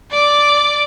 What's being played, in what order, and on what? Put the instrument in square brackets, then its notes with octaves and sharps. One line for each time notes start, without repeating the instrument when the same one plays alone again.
[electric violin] D5 D6